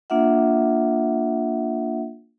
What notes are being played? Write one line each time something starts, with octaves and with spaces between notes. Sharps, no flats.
A#3 D4 F4 E5 F#5